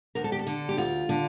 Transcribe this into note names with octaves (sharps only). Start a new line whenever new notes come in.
D2 A#4
A4
G4
A4
D3
G4
D2 F4
D3